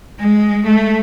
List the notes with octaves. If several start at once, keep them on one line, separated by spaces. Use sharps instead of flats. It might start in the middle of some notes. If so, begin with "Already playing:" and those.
G#3
A3